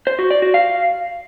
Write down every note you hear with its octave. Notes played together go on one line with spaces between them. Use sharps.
C5
F#4
D5
F#4
F5